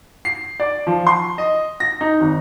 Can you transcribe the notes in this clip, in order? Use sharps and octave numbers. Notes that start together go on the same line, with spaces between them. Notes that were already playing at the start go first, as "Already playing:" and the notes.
C7
D5
F3
C6
D#5
A#6
D#4
G#1